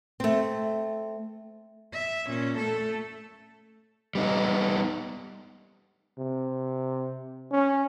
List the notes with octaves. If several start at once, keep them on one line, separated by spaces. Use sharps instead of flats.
A3 C4
E5
A#2 C#4
A3 A4
G3 B3 D#4
C3
C#4